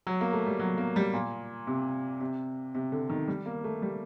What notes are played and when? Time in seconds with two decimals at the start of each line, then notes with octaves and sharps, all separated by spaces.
0.07 F#3
0.21 A#3
0.33 A3
0.47 G3
0.60 F#3
0.78 A#3
0.96 G3
1.13 A#2
1.67 C3
2.21 C3
2.75 C3
2.92 D3
3.10 D#3
3.28 G3
3.46 A#3
3.64 A3
3.82 G3